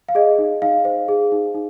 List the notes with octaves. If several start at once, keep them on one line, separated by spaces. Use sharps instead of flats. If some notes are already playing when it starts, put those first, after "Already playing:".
F5
G#4 D#5
D#4
D#4 F5
C5
G#4
D#4
D#4